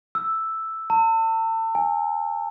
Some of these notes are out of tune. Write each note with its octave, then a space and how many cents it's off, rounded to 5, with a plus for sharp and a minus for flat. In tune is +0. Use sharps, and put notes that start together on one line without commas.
E6 +0
A5 +40
G#5 -25